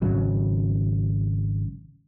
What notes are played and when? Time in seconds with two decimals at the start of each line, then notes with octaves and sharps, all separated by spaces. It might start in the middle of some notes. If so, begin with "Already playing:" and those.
0.02 G#1 C#3 F#3